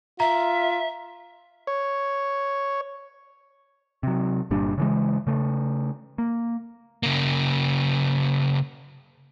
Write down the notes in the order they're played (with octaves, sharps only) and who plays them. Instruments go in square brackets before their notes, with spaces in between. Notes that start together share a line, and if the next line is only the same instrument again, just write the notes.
[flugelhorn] F4 [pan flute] E5 [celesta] A#5
[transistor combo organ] C#5
[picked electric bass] C3 F#3
G1 A#2 G3 D4
C#3 E3 G#3
C#3 A3
A#3
[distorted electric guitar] C#3 A#3